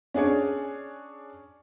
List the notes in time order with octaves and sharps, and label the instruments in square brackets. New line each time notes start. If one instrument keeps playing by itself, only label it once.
[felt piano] C#4 D4 G#4 C#5